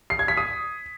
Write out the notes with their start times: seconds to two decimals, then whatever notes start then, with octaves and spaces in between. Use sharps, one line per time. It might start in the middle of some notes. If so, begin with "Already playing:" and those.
0.10 C7
0.19 G#6
0.28 B6
0.37 D#6